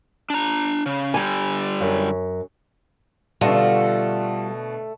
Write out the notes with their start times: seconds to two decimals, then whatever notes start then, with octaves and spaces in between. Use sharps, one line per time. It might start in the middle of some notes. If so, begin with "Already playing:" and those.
0.30 D4 A#5
0.86 C#3
1.14 D3 G3 G#5
1.81 F#2
3.41 B2 D3 G3 A3 F4 F#4 A4